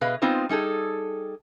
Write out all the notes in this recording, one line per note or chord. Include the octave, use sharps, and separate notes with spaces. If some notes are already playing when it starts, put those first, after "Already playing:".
B2 G#4 B4 D#5 F5
G#3 B3 C4 D#4 F4 C5
G3 D#4 G#4 A4